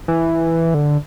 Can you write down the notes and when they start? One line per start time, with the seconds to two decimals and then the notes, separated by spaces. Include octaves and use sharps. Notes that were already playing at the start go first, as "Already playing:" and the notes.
0.08 E3
0.74 D3